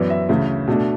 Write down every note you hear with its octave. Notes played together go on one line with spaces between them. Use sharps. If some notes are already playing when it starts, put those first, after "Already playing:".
Already playing: F#2 E3 B3 D5
E5
D2 C#3 E3
B2 A3 D4